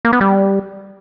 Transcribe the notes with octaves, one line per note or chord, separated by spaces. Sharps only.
A#3
B3
G3